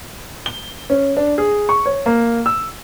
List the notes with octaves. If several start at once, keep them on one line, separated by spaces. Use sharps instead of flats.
G7
C#4
D4
G#4
C#6
C#5
A#3
E6